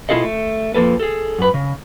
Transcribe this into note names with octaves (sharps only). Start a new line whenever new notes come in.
B2 E4 F4 G#4 A4 D#5
A3
F2 F3 A#3 A4 B4
G#4 A4
F#2 B4
C#3